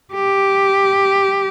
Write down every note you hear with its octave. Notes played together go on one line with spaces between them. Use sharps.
G4